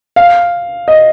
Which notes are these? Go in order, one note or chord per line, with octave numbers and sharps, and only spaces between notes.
F5
D#5